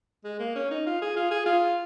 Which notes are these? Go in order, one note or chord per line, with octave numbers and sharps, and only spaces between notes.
G#3
A#3
C#4
D#4
F4
G#4
F4
G#4
F4